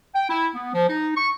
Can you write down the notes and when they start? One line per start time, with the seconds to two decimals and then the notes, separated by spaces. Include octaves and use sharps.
0.15 G5
0.29 E4
0.55 B3
0.74 F3
0.89 D#4
1.17 C#6